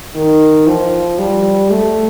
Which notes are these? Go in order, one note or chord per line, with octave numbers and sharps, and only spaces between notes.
D#3
F3
G3
A3